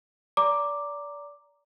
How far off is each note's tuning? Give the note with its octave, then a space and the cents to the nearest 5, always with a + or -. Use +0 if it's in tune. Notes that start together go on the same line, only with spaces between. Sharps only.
D5 -25 A#5 +0 D6 +0